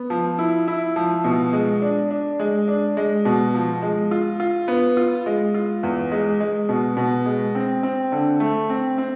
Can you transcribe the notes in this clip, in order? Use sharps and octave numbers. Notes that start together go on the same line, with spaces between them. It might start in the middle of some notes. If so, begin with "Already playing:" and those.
Already playing: B3
F3
E4
E4
F3
B2
G#3
D4
D4
G#3
D4
G#3
B2
F3
G#3
F4
F4
B3
F4
G#3
F4
E2
G#3
G#3
B2
B2
G#3
C4
C4
D3
A3
C4
C4